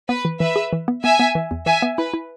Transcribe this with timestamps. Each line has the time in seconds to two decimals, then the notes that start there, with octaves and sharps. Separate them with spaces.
0.09 B3 B4
0.25 E3
0.40 E3 B4 E5
0.56 G#4
0.73 E3
0.88 B3
1.04 B3 E5 G#5
1.19 B3
1.35 E3
1.51 E2
1.66 E3 E5 G#5
1.82 B3
1.98 E4 B4
2.14 E4